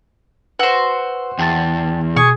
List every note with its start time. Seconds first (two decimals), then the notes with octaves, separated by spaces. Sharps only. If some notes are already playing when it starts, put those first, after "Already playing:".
0.59 F#4 B4 C5 E6
1.39 E2 G5 A5 A6
2.16 B2 G#4 C#6